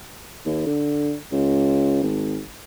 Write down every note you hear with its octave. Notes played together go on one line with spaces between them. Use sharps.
D#2
D3
C#2
G#1